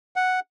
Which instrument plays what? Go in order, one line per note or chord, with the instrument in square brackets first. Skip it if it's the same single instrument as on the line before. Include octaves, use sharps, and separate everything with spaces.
[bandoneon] F#5